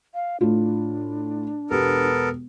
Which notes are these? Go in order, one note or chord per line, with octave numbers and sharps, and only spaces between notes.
F5
A2 D4 F4
E1 B3 G4 A4 A#4